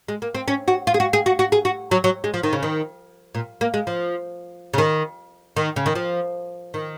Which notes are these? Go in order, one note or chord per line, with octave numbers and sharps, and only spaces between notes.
G#3
A#3
C4
C#4
F#4
F4
G#4
F#4
G#4
F#4
F#4
G#4
F#4
F#3
F#3
G#3
F3
D#3
C#3
D#3
A#2
A#3
G#3
F3
C#3
D#3
D#3
C#3
D#3
F3
D#3